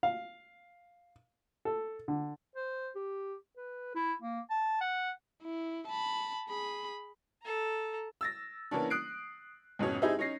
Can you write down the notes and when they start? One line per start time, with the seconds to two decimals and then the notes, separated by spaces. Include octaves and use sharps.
0.03 F5
1.65 A4
2.08 D3
2.56 C5
2.96 G4
3.57 B4
3.95 E4
4.22 A#3
4.50 A5
4.81 F#5
5.43 E4
5.88 A5 B5
6.48 G#4 B5
7.42 A4 A#5
8.21 E6 A6 A#6
8.71 E3 A#3 B3 C#4 D4
8.90 D#6 F#6 C7 D7
9.79 F2 G#2 B2 C#4
10.02 G3 C4 D#4 E4 G4 G#4
10.19 C#4 D#4 A#6 C7